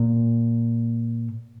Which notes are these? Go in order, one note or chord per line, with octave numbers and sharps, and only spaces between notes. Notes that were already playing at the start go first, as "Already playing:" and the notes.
Already playing: A#2